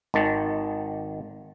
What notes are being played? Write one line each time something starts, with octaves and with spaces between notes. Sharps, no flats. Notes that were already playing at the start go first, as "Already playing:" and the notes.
G#1 D#3 A5